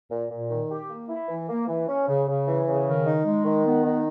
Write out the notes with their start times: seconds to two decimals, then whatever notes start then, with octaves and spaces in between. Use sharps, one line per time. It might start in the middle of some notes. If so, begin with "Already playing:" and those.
0.10 A#2
0.29 A#2
0.49 D#3
0.69 G4
0.89 A#3
1.08 E4
1.28 E3
1.48 A#3
1.67 E3
1.87 C#4
2.07 C#3
2.27 C#3
2.46 E3
2.66 C#3
2.86 D#3
3.05 D#4
3.25 G#3
3.45 D#3
3.64 B3
3.84 D#3